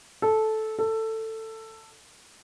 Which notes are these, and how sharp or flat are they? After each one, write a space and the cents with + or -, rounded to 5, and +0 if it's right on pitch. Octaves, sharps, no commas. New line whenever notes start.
A4 -10
A4 +15